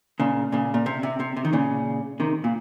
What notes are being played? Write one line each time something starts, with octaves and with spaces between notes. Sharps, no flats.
A#2 C#3
A#2 C#3
A#2
C3
C3
C3
C3
D#3
A#2 C#3
C3 D#3
A#2